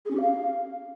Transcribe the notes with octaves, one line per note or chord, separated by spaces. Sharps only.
G#4
C#4
G4
F5